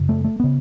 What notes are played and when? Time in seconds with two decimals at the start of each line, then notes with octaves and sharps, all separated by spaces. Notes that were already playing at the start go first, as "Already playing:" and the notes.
Already playing: F#2 C#3
0.09 A3
0.24 A3
0.40 C#3 B3